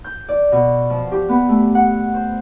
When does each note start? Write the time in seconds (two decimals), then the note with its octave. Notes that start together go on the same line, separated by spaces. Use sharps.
0.04 G6
0.28 D5
0.52 B2
0.90 F3
1.12 G4
1.29 B3
1.49 A3
1.75 F#5
2.14 C5